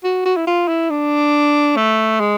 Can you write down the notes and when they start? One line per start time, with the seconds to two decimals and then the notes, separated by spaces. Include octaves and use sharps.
0.04 F#4
0.26 F#4
0.36 E4
0.47 F4
0.68 E4
0.90 D4
1.76 A3
2.20 G#3